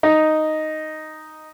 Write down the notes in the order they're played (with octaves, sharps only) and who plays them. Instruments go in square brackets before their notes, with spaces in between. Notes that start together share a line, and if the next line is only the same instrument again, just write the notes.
[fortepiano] D#4